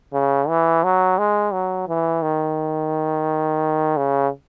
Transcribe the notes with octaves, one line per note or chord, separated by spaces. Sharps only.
C#3
E3
F#3
G#3
F#3
E3
D#3
C#3